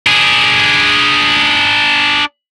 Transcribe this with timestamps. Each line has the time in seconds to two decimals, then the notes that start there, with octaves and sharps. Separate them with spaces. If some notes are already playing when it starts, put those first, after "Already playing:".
0.07 D4 G#4